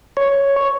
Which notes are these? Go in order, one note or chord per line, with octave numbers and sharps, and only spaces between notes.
C#5